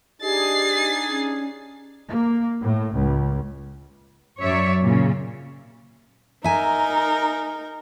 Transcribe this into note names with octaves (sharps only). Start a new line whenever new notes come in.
D4 D#4 G4 G#4 A6 C7
C#4
A#3
A2
C#2
F#2 F#3 C#5 D5 E5
A#2 C#3
D#4 A#4 E5 G#5 A#5